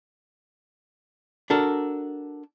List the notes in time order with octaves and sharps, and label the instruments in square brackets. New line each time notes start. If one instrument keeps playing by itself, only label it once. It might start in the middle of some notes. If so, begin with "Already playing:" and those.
[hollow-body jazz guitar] D4 F#4 A4 A#4